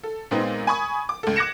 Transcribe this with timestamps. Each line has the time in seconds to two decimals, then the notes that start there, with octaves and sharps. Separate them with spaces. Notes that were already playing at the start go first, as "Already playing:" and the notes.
0.03 A4
0.31 A#2 G#3 B3 C4 D#4
0.67 G#5 B5 C#6 D#6
1.09 D6
1.23 C#2 A4
1.36 D6 F#6 G#6 A#6 C#7 E7